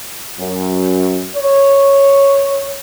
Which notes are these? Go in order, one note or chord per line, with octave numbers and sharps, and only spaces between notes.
F#2
C#5